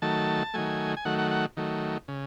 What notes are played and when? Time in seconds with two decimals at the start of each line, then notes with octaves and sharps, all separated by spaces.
0.02 D#3 F#3 A3 A5
0.54 D#3 F#3 A3 G#5
0.97 G#5
1.05 D#3 F#3 A3 F#5
1.19 F#5
1.31 F#5
1.57 D#3 F#3 A3
2.08 C#3